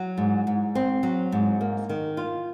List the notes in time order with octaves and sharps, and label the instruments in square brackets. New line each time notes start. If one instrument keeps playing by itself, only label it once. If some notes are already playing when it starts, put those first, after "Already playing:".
Already playing: [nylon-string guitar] F#3
G#2
G#2
C4
F#3
G#2
A#3
D#3
F4